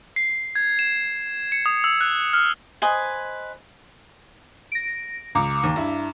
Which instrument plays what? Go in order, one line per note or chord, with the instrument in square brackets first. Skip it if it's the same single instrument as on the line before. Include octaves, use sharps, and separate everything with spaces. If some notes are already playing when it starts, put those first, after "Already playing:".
[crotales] C7
G#6
E7
C#7
D#6
E6
F#6
F6
[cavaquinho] B4 C5 D#5 G#5
[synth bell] A#6 D7
[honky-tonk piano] C#2 [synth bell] A#5 D6
[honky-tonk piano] D#2
G2 E4